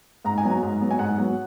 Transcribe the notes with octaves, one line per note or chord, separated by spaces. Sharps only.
G#2 A#5
G#5
F#3 B3
A#5
G#2
F#3 B3
G#5
G#2 F#5
F#3 B3